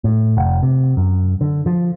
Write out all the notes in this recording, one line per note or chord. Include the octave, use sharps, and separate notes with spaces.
A2
F1
C3
F#2
D3
F3